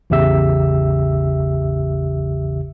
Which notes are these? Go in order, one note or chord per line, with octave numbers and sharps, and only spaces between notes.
A1 E2 C#3 G4 E5 E6